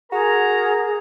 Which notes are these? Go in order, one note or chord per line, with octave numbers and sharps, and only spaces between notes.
F#4 G#4 A#4 A#5